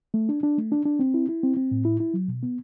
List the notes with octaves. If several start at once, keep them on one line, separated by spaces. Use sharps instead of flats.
A3
D4
D4
A3
D4
D4
C4
E4
E4
C4
C4
A2
E4
E4
F#3
B2
B3